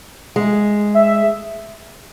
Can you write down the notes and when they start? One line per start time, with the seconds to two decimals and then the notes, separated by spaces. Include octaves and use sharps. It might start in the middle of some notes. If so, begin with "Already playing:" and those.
0.36 G#3
0.95 E5